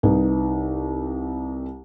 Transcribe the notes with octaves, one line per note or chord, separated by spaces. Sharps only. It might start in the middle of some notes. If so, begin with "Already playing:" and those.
C2 D#4 B4